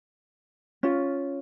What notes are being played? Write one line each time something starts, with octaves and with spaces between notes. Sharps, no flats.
C#4 F4